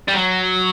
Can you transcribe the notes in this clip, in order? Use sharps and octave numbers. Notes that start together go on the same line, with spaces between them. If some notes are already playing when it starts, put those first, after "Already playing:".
G3
F#3